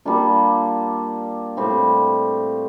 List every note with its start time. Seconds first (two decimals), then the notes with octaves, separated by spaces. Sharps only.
0.05 G3 A#3 D4 F4
1.57 A2 G3 C4